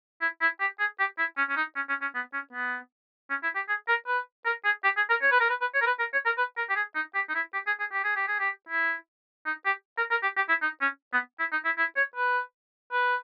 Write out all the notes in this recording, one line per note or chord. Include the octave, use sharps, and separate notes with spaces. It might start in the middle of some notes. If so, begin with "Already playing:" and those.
E4
E4
G4
G#4
G4
E4
C#4
C#4
D#4
C#4
C#4
C#4
B3
C#4
B3
C#4
E4
G4
G#4
A#4
B4
A#4
G#4
G4
G#4
A#4
C#5
B4
A#4
B4
B4
C#5
A#4
B4
A#4
C#5
A#4
B4
A#4
G4
G#4
D#4
G4
D#4
E4
G4
G#4
G#4
G4
G#4
G4
G#4
G4
E4
D#4
G4
A#4
A#4
G4
G4
E4
D#4
C#4
B3
E4
D#4
E4
E4
C#5
B4
B4